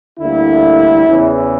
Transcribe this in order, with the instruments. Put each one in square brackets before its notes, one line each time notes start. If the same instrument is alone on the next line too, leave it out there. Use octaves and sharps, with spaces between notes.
[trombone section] D2 D3 G3 A#3 E4
E2 C#3 E3